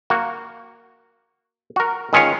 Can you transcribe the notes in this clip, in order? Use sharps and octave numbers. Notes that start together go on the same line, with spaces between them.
A#3 F#4
F#4 A#4
D#3 G#3 C#4 F4 C#5